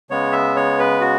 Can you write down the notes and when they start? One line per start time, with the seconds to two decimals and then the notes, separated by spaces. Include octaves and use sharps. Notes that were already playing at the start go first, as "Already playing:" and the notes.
0.10 C#3 G#3 B3 C#5
0.32 E5
0.56 C#5
0.79 B4
1.01 F#4